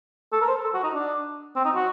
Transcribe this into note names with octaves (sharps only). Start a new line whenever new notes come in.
A4
A#4
C5
A4
F#4
D#4
D4
C4
D#4
F#4